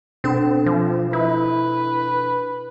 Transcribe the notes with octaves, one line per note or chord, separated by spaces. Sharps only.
B2 C4 D4 A4
F3
E4 B4